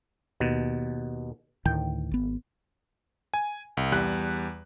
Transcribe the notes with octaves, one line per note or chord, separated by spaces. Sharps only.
D#2 B2
D2 A2 D#3 G5
G#1 B3
G#5
C2
E2 G3 F#6